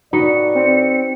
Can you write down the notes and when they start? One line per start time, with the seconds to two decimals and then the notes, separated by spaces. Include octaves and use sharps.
0.13 A2 D#4 F#4 B4 D5 C#7
0.55 C4